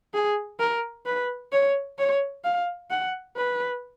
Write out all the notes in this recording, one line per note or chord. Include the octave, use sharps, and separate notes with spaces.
G#4
A#4
B4
C#5
C#5
F5
F#5
B4